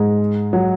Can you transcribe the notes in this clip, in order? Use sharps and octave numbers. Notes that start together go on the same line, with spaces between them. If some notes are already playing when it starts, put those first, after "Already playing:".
Already playing: G#2 G#3
F#3